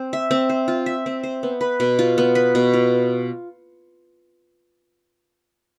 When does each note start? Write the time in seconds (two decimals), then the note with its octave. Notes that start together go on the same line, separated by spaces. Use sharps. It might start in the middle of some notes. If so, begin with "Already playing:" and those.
Already playing: C4 C5
0.13 E5
0.31 C4
0.50 C5
0.68 F4
0.86 E5
1.06 C4
1.23 C5
1.43 B3
1.61 B4
1.80 B2
1.99 F4
2.18 B3
2.35 B4
2.55 B2
2.74 F4